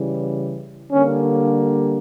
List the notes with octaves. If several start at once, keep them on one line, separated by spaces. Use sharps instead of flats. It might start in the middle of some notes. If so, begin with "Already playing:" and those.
Already playing: C#3 E3 G3
D3 G3 A#3 C#4